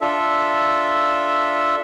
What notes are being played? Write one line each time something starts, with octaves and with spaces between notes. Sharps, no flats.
D4 F4 A4 E5